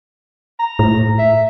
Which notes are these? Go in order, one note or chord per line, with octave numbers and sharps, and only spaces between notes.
A#5
A2
E5